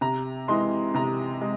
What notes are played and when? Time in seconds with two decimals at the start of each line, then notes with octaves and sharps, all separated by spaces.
0.01 C3 A#5
0.48 E3 G#3 C6
0.94 C3 A#5
1.41 G#3